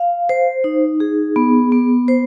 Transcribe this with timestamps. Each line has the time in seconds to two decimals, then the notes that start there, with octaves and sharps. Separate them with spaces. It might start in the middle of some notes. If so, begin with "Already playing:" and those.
Already playing: F5
0.29 C5
0.64 D#4
1.00 G#4
1.36 B3
1.72 B3
2.08 C5